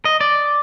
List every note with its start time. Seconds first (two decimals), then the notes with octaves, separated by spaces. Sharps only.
0.05 D#5
0.21 D5